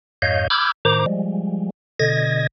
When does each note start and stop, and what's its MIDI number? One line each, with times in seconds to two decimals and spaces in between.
0.22 0.48 41
0.22 0.48 44
0.22 0.48 73
0.22 0.48 75
0.22 0.48 77
0.22 0.48 91
0.50 0.72 83
0.50 0.72 86
0.50 0.72 88
0.50 0.72 89
0.50 0.72 91
0.50 0.72 92
0.85 1.06 45
0.85 1.06 51
0.85 1.06 72
0.85 1.06 82
0.85 1.06 86
1.06 1.70 53
1.06 1.70 55
1.06 1.70 56
2.00 2.47 47
2.00 2.47 50
2.00 2.47 75
2.00 2.47 92
2.00 2.47 94